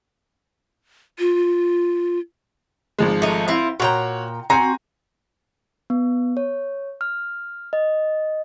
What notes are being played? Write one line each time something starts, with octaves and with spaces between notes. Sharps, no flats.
F4
G#1 F3 G#3
A3 D#4
C4 E4 F4
A#2 F#4 C#5 G5 A#5
C4 F#4 G#5 A#5
B3
C#5
F6
D#5